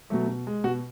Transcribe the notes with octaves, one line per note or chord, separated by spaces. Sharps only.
B2 F#3 A3
B2
G#3
B2 F#4